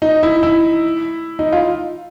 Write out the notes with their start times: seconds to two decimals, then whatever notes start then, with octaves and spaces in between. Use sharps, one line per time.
0.02 D#4
0.23 E4
0.43 E4
1.39 D#4
1.52 F4